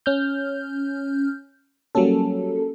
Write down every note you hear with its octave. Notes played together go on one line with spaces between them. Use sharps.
C#4 F6 G6
F#3 G3 A#3 C#4 A4